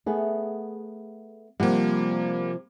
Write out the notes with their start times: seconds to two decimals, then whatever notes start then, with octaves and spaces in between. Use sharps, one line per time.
0.06 A3 B3 G#4
1.60 C3 F3 G3 A#3 F#5